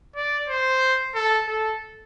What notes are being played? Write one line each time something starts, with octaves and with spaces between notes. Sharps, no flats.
D5
C5
A4
A4